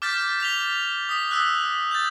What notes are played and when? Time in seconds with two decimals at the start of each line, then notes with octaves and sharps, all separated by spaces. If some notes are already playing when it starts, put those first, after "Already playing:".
0.02 D6 F6 G6 A6 B6
0.40 B6 F7 G7
1.09 D#6 B6
1.31 D#6 E6 F#6
1.91 G6 A6